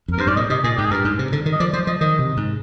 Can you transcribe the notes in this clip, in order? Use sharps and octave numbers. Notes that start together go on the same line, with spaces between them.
F2 A#4
G2 C5
G#2 D5
A#2 D#5
C3 D#5
A#2 G#4
G#2 G4
G#4
G2 A#4
G#2
C3
D3
D#3
D#5
F3 D5
F3 C5
F3 D#5
D#3 D#5
C3
G#2